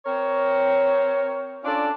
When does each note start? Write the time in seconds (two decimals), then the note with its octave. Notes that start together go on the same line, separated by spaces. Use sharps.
0.06 C4 A#4 C#5
1.63 C#4 D4 F4 A4 D5